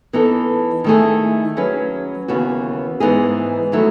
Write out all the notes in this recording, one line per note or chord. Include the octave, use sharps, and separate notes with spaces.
E3 B3 D#4 A4
D#3 A3 E4 G#4
F#3 C#4 G#4 B4
D#2 C#3 E3 B3 F#4
G#2 E3 B3 D#4 G#4
D#3 F#3 A3 E4